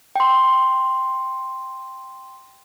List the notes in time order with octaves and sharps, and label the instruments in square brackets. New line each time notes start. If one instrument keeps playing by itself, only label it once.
[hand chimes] G5 C6